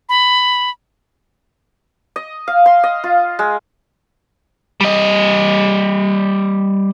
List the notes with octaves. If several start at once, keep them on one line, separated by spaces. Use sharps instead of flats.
B5
D#5
F5
C6
D#5
F4
G#3
G3 D#5